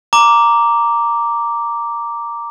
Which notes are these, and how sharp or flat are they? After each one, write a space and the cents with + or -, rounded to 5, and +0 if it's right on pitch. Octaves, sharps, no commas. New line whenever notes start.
A#5 +0 D6 -5